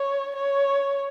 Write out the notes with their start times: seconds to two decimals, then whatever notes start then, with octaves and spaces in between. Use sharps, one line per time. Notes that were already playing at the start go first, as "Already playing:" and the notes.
Already playing: C#5
0.35 C#5